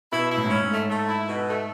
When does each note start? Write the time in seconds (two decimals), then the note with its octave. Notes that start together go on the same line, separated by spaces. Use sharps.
0.12 B2 E4
0.31 E4
0.37 A2
0.46 G#2
0.50 A2 C#4
0.63 G#2
0.70 A3
0.89 A3
1.08 E4
1.27 B2
1.47 A3